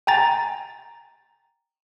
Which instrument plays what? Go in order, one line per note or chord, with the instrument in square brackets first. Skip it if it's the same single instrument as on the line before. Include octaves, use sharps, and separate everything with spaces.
[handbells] G5 G#5 A#5 A6